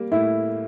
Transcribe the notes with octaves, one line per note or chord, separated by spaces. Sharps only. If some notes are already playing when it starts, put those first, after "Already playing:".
Already playing: G3 A#3
A2 E4